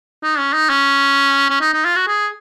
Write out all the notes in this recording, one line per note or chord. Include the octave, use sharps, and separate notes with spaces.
D#4
C#4
D#4
C#4
C#4
D#4
D#4
F4
F#4
G#4